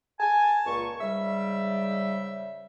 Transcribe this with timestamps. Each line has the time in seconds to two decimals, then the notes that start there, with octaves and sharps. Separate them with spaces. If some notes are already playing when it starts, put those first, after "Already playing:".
0.20 G#5 A5
0.66 C#2 A#2 C#6
1.01 G#2 C#3 G3 E5